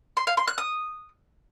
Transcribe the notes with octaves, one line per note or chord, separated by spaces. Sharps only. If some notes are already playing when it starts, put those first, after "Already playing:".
C6
F5
C6
F#6
D#6